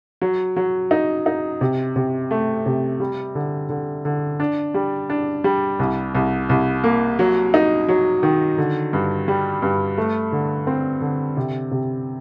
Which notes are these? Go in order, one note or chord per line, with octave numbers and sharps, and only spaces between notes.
F#3
F#3
D#4
D#4
C3
C3
A3
C3
G3
D3
D3
D3
D4
G3
D4
G3
C2
C2
C2
A#3
F#3
D#4
F#3
D#3
D3
G2
G3
G2
A3
D3
C4
D3
C3
C3